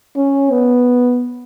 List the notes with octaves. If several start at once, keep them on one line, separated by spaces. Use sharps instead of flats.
C#4
B3